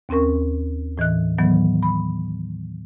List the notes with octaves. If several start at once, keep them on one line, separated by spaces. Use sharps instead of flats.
D#2 C4 C#4 A#4 C#6
A2 E3 D#5 F#6
A2 D#3 E3 F#3 B3
B5